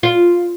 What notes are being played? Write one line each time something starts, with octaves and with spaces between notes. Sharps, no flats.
F4